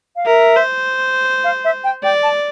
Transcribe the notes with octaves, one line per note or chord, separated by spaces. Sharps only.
F5
A#4 E5
C5
F5
E5
G5
D5 G5
A5